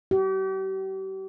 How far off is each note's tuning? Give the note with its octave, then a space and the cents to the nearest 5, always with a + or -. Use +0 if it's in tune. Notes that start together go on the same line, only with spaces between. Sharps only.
G4 -40